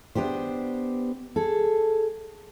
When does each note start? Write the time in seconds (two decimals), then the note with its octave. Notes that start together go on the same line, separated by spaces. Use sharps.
0.15 B3 D4 G4 C5
1.36 G#4 A4